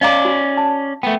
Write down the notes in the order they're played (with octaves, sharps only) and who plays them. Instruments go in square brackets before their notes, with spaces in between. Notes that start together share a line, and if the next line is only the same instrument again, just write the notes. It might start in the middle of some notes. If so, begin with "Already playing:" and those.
[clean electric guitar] C#4 D5 [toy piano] D#5 F5 A#5
[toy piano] F#4
A5
[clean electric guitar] A3 B3 [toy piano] G5